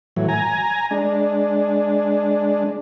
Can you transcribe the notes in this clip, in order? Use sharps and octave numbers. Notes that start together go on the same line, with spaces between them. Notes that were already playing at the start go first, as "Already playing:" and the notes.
A2 E3 F#3
G#5 A#5
G#3 D4